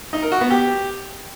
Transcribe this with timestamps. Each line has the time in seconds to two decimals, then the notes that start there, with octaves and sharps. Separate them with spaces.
0.13 D#4
0.22 A#4
0.32 F#4
0.41 B3
0.50 G4